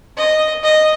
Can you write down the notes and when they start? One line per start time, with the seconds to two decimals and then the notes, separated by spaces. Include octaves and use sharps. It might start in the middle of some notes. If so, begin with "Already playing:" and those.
0.17 D#5
0.64 D#5